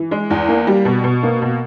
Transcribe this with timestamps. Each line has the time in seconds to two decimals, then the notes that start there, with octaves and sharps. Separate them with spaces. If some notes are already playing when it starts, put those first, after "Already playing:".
Already playing: E3
0.11 G#3
0.30 E2
0.48 A#3
0.67 G3
0.85 B2
1.04 B2
1.23 A#3
1.42 B2